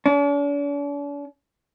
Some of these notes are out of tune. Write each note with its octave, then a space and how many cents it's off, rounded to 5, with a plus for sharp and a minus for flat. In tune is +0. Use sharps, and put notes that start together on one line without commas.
D4 -45